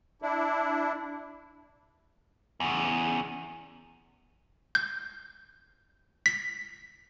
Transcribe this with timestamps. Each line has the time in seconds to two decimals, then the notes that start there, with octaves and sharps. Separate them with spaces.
0.22 D4 E4
2.60 E2 C#3
4.75 G6
6.26 B6